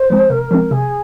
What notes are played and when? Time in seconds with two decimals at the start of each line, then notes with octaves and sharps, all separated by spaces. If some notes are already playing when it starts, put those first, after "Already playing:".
Already playing: C5
0.10 F3 G#3 C4
0.30 C3 A#4
0.51 F3 G#3 C4
0.71 C3 G#4